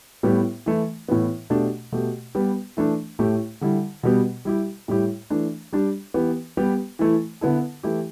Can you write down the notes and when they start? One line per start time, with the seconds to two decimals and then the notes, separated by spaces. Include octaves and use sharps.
0.23 A2 G3 B3 G4
0.66 E3 A3 E4
1.08 A2 E3 B3
1.50 B2 A3 D4 G4
1.92 B2 A3 G4
2.35 G3 B3 G4
2.77 E3 A3 D4
3.19 A2 A3 G4
3.61 D3 G3 E4
4.03 B2 G3 B3 G4
4.45 G3 E4 G4
4.88 A2 G3 E4 G4
5.30 E3 A3 D4
5.73 G3 D4 G4
6.14 E3 B3 G4
6.57 G3 B3 G4
6.99 E3 A3 E4
7.41 D3 B3 E4 A4
7.83 E3 A3 E4 G4